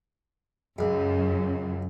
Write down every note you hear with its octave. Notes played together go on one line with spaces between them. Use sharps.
C#2 F#2